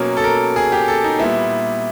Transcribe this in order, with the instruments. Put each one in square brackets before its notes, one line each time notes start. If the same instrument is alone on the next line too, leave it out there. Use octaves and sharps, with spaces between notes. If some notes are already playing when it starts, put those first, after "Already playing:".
Already playing: [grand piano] B2 F#3 A#3 C#4
A4
A#4
G#4
G4
A4
D#4
A#2 G3 B3 E4